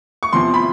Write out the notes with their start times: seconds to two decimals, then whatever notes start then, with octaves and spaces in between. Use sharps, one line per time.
0.23 C#6
0.33 E2 C3 F3 C6
0.54 B5